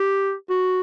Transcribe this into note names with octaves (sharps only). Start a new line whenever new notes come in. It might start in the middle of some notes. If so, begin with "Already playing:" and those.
Already playing: G4
F#4